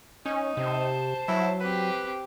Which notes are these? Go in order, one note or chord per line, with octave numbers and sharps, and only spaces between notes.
C#4 D#4
C3 C5 A5
F#3 E4
C4 G4 B4